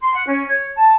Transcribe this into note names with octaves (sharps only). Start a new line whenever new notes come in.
C6
F#5
C#4
C#5
A5